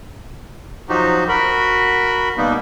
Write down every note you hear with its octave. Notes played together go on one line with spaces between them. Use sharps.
F3 F#3 D#4 F#4 G4
F#4 A#4 B5
B2 G3 A#3 B3 D#4